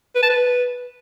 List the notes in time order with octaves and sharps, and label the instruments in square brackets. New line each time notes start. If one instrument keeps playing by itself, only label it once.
[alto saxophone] B4
A5
B4